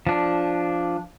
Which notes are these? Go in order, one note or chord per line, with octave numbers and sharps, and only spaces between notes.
F3 D4